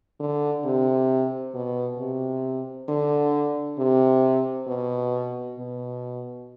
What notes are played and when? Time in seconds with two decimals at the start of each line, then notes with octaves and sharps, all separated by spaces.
0.20 D3
0.65 C3
1.54 B2
1.99 C3
2.89 D3
3.78 C3
4.68 B2
5.58 B2